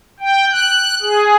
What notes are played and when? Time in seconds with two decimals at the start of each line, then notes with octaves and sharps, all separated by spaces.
0.20 G5
0.52 F#6
1.02 G#4